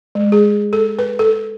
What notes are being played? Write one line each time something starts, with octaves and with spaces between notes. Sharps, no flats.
G#3
G#4
A4
B4
A4